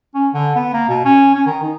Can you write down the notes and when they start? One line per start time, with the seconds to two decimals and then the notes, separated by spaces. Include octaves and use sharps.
0.15 C#4
0.34 D3
0.56 B3
0.74 A#3
0.89 B2
1.05 C#4
1.35 C#4
1.46 D#3
1.63 D#4